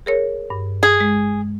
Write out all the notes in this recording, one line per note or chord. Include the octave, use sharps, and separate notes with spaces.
G#4 A#4 C#5
G2
G#4
G#3